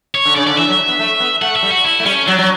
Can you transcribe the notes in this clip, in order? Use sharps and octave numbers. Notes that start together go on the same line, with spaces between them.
C#5
D3
C#3 D5
D3 D5
E3 E5
F#3
B3
A3
B3
A3 F#5
E5
G3
F#4
E4
A3
G3 C#4
F#3 D4
F#3